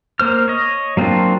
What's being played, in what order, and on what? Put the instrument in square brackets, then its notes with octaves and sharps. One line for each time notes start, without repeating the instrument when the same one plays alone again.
[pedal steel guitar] A#3 C5 F6
C#5 D#5
F#3 A#3 C4 D4 F4